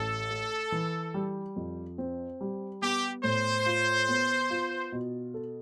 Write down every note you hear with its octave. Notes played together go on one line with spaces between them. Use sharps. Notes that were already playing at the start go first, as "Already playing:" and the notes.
Already playing: A1 A4
A3
E3
G3
F2
C4
G3
B3 G4
A2 C5
F4
B3
F4
B2
A4